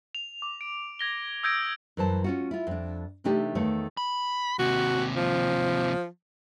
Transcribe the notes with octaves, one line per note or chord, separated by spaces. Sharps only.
F7
D6
D7
G#6 A#6 G7
D#6 E6 G6 G#6 A#6 D7
F#2 E3 C5 A5
C#4 F4 F#4
E4 F4
F2 D4
C3 E3 A3 D4 D#4 G4
E2 D#3 A3 A4 C#5 F5
B5
D#2 C3 F#4
F3